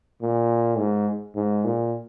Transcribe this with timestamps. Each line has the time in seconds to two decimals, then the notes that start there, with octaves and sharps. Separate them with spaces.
0.22 A#2
0.78 G#2
1.35 G#2
1.64 A#2